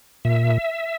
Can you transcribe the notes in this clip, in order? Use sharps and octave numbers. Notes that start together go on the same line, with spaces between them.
A#2 E5